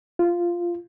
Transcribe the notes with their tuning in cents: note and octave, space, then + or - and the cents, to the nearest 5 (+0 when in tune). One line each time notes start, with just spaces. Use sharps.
F4 -5